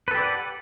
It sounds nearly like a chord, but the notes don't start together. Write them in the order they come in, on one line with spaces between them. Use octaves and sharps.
B4 A4 G4 D5 F#5